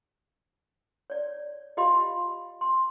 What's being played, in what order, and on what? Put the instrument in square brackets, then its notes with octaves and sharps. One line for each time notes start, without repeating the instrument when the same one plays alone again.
[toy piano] C#5 D5
F4 G4 D#5 F5 B5 C6
C6